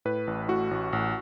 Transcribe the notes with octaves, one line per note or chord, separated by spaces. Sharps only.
A2 B4
A1
A2 F#4
A1
A1